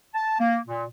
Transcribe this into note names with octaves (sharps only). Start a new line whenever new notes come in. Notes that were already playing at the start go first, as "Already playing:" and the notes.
A5
A#3
A#2